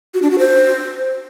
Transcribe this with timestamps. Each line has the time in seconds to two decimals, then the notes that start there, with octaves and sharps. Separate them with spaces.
0.14 F#4
0.22 D4
0.31 F#4
0.39 C5